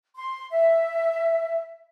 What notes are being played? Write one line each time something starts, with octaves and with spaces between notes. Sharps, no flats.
C6
E5